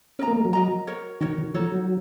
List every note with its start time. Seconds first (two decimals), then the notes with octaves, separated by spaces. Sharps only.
0.19 C#4 A#4 D#5 A#5
0.28 A#3
0.36 A3
0.45 F#3
0.53 A#4 D#5 A#5
0.87 F#4 A#4 C#5
1.21 D#3 F#4 A#4 C#5
1.38 D#3
1.54 F3 D#4 F#4 A4 C#5
1.72 F#3